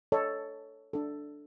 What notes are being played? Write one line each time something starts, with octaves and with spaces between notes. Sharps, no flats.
A4 C#5 D#5
D4 A4